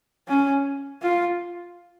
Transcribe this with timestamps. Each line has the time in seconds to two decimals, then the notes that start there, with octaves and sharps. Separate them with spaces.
0.28 C#4
1.02 F4